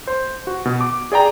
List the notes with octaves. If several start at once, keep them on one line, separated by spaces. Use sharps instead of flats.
C5
F#4
B2
D6
G#4 D5 G5 A#5